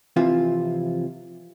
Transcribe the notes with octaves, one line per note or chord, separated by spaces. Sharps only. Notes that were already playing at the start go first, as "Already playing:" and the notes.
C3 E3 F3 F4